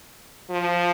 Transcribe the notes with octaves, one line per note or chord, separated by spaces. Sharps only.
F3